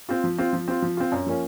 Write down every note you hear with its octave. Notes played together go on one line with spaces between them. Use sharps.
C4 F4
F3
C4 F4
F3
C4 F4
F3
C4 F4
F#2
F3 A#3 C#4